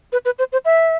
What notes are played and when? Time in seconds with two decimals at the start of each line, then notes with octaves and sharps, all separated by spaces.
0.12 B4
0.25 B4
0.39 C5
0.52 C5
0.65 E5